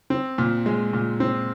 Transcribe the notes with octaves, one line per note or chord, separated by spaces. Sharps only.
C4
A#2
G#3
A#2
C4